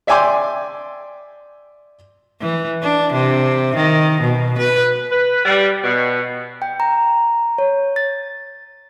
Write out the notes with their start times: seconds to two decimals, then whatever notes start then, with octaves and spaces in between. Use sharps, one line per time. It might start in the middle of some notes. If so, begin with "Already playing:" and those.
0.07 D5 E5 G5 G#5 C6 D6
2.41 E3
2.82 D4
3.13 C3
3.76 D#3
4.21 B2
4.58 B4
5.12 B4
5.45 G3
5.83 B2
6.62 G5
6.80 A#5
7.58 C#5
7.96 A6